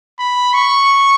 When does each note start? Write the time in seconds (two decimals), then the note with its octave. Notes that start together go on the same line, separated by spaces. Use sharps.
0.19 B5
0.54 C#6